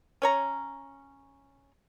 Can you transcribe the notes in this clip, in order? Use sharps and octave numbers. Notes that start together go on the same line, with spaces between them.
C#4 C#5 A#5